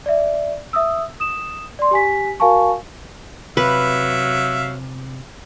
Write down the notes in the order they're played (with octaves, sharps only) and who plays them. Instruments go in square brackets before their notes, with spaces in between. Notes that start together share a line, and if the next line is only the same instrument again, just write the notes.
[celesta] D5 E5
E5 D#6 E6
D#6 E7
D5 C6
G4 G#5 B6
F#4 A#4 F5 G#5 A5 C#6
[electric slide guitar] C3 [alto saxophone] F#3 [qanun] B4 [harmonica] E5 F5